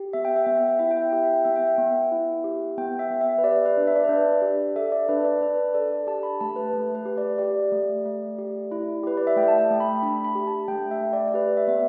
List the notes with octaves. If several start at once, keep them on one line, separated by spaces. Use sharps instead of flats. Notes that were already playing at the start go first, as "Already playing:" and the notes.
Already playing: G4
B3 E5
G5
E5
B3 G5
E5
G5
E4 E5
G5
E5
G4 G5
E5
G5
B3 E5
G5
E5
B3
E4
G4
B3 G5
E5
B3
E5
B4
G4 D5
B4
D4
E5
D5
B4
D4 D5
G4
A4 E5
D5
D4 B4
D5
D4 B4
A4 D5
G4 A5
B5
A3 A5
B4
A3
B4
G4
D5
G4 D5
A3
A3
G4
E4
G4 B4
D5
E5
A3 G5
A5
G5
A3
B5
D4 B5
B5
G4
A5
A3 G5
E5
A3
D5
D5
G4 B4
E5
B3 E5